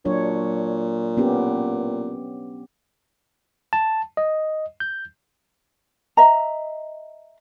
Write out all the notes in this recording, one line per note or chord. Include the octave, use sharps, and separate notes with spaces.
A#2 F#3 D4 C#5
B3 C#4 G4
A5
D#5
G6
D#5 E5 A#5